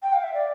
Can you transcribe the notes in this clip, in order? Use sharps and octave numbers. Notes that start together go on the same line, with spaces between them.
G5
F5
E5
D5